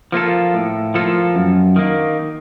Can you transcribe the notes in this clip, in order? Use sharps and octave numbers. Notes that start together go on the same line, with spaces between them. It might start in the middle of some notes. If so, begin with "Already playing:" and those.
F3 A#3 F4 A4
A2
F3 A#3 F4 A4
F#2
D#3 A#3